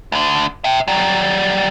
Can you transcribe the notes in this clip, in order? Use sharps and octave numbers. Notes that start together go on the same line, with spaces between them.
D2 D3
E5 G5
F#3 G3